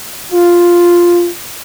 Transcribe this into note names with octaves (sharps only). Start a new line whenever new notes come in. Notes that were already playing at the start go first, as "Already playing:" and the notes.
F4